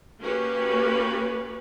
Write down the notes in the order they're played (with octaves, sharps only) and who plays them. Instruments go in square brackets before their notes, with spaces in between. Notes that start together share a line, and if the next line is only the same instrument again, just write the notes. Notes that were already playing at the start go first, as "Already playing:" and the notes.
[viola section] A#3 C#4 F#4 G4 B4